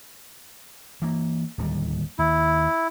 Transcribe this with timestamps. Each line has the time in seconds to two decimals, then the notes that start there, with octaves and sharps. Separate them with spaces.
1.02 E3 A#3
1.58 D1 D#2 G3
2.19 D#2 E4